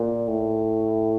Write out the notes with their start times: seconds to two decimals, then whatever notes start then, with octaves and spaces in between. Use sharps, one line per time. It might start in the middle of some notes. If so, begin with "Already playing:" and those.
Already playing: A#2
0.28 A2